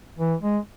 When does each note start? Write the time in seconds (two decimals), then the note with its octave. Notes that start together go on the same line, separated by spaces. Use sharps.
0.18 E3
0.42 G#3